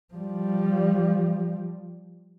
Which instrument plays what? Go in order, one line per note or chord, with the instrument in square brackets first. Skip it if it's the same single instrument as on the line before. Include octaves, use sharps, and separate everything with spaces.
[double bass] F3 G3